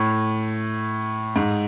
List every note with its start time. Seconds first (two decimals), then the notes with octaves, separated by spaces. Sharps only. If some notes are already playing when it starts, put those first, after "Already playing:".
Already playing: A2
1.36 G#2